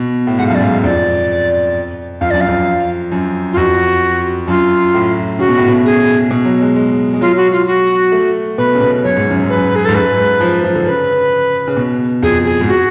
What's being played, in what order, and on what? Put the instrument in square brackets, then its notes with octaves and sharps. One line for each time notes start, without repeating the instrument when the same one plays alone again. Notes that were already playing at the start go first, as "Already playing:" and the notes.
Already playing: [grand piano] B2
A2
[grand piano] G#2 [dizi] F#5
[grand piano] F#2 [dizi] F5
[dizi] D5
[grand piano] G#2 [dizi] F5
[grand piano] G#2
[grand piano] F2 [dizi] D5
[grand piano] F2 [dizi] F5
[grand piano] F#2 [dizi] D5
[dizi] F5
[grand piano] F2
F#2
[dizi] F4
[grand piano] F2 [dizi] F#4
[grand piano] F#2 [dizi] F4
[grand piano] A2
[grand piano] C#3 [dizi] F#4
[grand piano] B2
A2
B2
[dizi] G#4
[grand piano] B2
F#3
G#3
G#3
G#3
[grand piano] F#3 [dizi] F4
[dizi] F#4
F4
F#4
[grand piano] A3
[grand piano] B2 [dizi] B4
[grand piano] C#3
B2
[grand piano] F#2 [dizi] C#5
[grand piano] G#2
F#2
G#2
[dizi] B4
[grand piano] F#2
[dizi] G#4
[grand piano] G#2 [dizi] A4
[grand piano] F#2 [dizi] B4
[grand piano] G#2
F3
F3
D3
[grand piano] C#3 [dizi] B4
[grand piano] C#3
B2
[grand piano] F2 [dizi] G#4
[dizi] G#4
[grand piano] G#2
[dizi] F#4